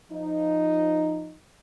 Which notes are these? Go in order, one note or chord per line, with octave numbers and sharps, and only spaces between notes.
F3 D#4